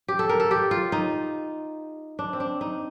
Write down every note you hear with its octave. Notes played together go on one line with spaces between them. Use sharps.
G4
A4
A#4
A4
G4
F4
D#4
D4
C4
D4
D#4